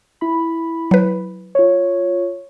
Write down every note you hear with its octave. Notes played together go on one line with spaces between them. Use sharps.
E4 B5
F#3 B4
F4 C#5